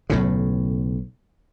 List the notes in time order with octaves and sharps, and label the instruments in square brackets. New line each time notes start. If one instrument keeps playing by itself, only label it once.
[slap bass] B1 A2 C#3